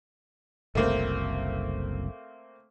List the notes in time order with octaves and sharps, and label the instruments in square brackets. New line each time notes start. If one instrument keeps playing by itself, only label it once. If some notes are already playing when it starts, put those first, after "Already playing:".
[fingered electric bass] F#1 C2 [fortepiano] A3 A#3 C4